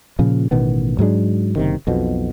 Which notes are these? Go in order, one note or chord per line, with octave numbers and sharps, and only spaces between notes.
A#2 C#3 F3
A1 B2 D#3 B3
G#2 F#3 G#3 D4
F#1 C3 D#3
B1 F2 B2